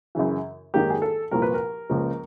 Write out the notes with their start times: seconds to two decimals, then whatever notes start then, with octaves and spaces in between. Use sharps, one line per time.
0.15 F#2 C#3 E3
0.74 G#2 D#3 F#3 A#3 G4
0.90 G#4
1.02 A4
1.31 C2 A#2 F3 A#3 A#4
1.42 B4
1.54 A#4
1.89 C#2 C#3 F3 A#3